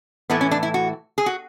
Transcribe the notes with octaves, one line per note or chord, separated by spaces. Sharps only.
A2 E3 A3 B3
C#4
D4
E4
F#4
G#4
F#4